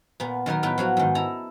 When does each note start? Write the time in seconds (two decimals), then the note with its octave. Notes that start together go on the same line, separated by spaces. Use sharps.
0.20 A#2 B3
0.46 D#3 F#3 B3 A#4
0.63 A2 B3 B4 G5
0.78 F3 F#3 F#4
0.97 G#2 D#3
1.15 E4 A4 A#5